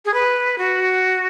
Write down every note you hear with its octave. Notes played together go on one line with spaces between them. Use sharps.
G#4
B4
F#4